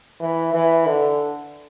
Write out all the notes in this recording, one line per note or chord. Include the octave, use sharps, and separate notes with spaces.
E3
E3
D3